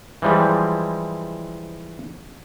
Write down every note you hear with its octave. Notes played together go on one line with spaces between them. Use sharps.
E3 F3 G3 G#3